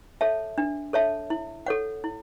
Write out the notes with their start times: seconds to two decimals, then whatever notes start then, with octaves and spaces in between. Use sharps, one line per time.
0.21 A4 C#5 E5 A5
0.58 D4
0.93 A4 C#5 E5 A5
1.30 E4
1.66 A4 C#5 F#5
2.04 E4